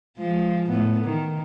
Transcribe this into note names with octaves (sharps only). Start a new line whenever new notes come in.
F3 G#3
A2 B3
D#3